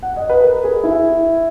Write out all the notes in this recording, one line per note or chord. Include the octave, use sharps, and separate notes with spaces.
F#5
D#5
B4
A#4
G#4
E4